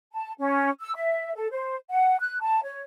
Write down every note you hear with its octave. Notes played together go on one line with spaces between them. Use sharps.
A5
C#4
E6
E5
A4
C5
F#5
F#6
A5
C#5